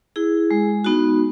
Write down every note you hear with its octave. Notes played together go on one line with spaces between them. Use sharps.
E4 G#4
G#3
B3 D#4 F#4